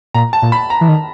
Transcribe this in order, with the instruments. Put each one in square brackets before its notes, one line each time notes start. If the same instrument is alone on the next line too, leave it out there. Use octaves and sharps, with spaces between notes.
[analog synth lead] A#2 [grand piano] A#5
[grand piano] A5
[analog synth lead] A#2
[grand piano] B5
A#5
[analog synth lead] E3
D#3